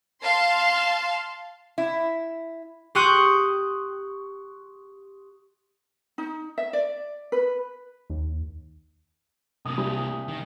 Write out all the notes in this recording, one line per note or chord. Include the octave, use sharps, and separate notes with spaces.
F5 A5 C6
E4
G4 C6 C#6 D#6 F#6 G6
D#4
E5
D5
B4
D#2
C3 A#3 D#6
C2
D#3